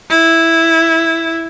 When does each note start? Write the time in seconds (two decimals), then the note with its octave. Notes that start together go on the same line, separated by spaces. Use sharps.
0.10 E4